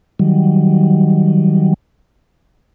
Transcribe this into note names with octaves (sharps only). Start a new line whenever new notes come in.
D#3 F#3 G3